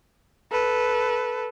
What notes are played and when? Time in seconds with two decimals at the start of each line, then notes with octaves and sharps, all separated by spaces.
0.51 A4 B4